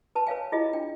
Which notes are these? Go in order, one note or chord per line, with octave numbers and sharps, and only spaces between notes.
B4 A5
B4 C#5 F5 G#5
E4 F4 G#4 D#5
D4 G5